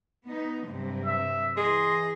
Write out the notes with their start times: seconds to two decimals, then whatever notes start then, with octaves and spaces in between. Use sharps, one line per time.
0.24 B3 D#4
0.65 G2 C3 F#3
1.06 E5
1.57 E3 G#4 D#5 C6